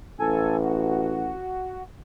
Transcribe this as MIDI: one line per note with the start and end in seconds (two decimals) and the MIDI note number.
0.20 1.37 33
0.20 0.57 69
0.20 0.57 80
0.63 1.83 66